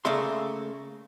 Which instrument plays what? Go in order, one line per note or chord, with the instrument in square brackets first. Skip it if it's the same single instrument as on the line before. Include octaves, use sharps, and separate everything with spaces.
[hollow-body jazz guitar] C#3 A3 A#3 E5 C6